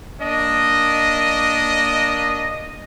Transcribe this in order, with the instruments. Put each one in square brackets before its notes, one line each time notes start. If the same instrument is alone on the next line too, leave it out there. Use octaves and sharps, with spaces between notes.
[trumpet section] A#3 D4 D#5